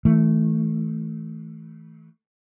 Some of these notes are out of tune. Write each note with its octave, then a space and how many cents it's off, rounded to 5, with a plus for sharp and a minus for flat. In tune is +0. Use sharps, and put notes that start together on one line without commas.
E3 -35 A3 -5